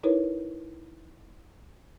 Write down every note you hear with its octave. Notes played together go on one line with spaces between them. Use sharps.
D#4 E4 A#4 B4 C#5